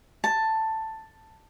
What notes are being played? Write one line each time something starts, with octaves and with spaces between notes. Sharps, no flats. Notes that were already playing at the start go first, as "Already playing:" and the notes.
A5